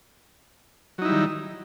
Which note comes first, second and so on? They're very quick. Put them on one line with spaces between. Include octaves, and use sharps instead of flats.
F#3 D#4 E4 G3 D#3